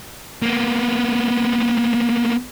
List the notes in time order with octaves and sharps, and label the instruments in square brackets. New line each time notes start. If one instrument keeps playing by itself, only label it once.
[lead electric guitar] A#3 B3